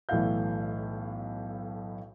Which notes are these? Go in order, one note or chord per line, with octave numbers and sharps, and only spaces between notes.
B1 A2 E3 E5 F5 G6